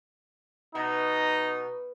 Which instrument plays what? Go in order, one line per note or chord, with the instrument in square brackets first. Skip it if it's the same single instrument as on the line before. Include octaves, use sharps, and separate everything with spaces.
[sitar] B2 [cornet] D#4